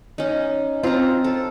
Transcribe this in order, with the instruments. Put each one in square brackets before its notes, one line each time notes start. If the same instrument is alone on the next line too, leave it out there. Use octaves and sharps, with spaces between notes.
[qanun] C#4 D#4
[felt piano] C4 [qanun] F4 A#5
[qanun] A4